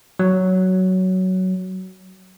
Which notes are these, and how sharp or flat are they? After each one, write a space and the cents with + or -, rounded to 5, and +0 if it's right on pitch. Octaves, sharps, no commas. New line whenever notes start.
F#3 +10